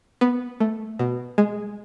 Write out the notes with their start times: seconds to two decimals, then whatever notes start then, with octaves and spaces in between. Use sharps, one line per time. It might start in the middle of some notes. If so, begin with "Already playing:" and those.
0.21 B3
0.60 A3
0.99 B2
1.38 G#3